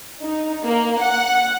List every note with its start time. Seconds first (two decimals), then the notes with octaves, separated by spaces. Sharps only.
0.24 D#4
0.65 A#3
1.00 F#5